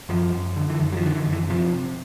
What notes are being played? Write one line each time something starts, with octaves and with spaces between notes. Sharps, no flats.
F#2 F3
F#2
D3
E3
F#2 D#3
F#3
F3
D3 D#3
E3
F#2
E3
C3 F3
C3